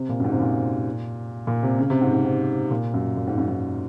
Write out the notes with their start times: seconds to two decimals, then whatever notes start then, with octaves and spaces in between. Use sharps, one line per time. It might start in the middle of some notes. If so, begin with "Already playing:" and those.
Already playing: C3
0.09 A#2
0.20 F#2
0.24 G#2
0.32 C3
0.40 A#2
1.47 A#2
1.63 C3
1.79 C#3
1.90 C3
2.01 G#2
2.13 G#2
2.25 G#2
2.71 A#2
2.94 F#2
3.17 A#2
3.27 G#2
3.38 F#2
3.48 G#2